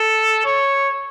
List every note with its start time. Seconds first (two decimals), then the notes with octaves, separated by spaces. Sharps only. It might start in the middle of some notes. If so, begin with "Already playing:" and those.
Already playing: A4
0.45 C#5